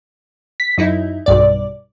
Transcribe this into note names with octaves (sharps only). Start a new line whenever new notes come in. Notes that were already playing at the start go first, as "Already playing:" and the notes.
B6
F#2 D#4 E4
B1 G2 D5